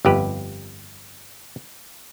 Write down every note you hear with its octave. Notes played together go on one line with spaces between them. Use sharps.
G1 F2 G4 B4